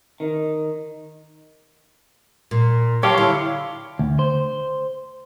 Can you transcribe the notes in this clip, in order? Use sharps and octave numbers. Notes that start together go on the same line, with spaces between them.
D#3
A#2
F#3 G4 C#5 F5 A5 C6
D3 E4
D2
C5